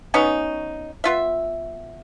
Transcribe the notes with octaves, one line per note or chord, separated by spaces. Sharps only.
F#3 B3 C#4 D#4
B3 F4 E5